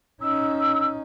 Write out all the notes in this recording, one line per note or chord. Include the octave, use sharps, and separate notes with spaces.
C#4 D#4 E6